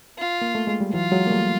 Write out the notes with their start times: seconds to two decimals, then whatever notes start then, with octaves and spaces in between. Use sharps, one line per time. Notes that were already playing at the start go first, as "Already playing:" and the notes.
0.18 F4
0.42 A#3
0.55 A3
0.67 G#3
0.81 G3
0.93 E3 F#3 F4
1.12 F#3 G#3
1.27 A#3
1.31 G3 A3